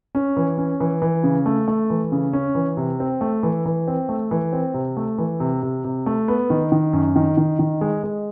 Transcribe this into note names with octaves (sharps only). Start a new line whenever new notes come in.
C#4
E3
C#4
E3
E3
C#3
A3
A3
E3
C#3
C#4
E3
C3
C4
A3
E3
E3
C4
A3
E3
C4
C3
A3
E3
C3
C3
C3
A3
B3
D#3
D#3
F#2
D#3
D#3
D#3
G#3
G#3